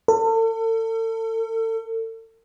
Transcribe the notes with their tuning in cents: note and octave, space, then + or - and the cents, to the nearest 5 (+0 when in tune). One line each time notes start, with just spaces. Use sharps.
A4 +40